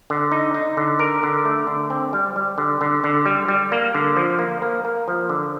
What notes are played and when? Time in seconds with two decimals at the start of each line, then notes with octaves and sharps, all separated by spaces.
0.10 D3
0.32 D#4
0.54 D#4
0.77 D3
0.99 A#4
1.23 D3
1.45 A3
1.67 D3
1.90 C4
2.13 G3
2.36 G3
2.58 D3
2.81 D3
3.04 D3
3.26 G3
3.48 G3
3.72 A#3
3.94 D3
4.17 F3
4.39 A#3
4.62 A#3
4.85 A#3
5.08 F3
5.29 D3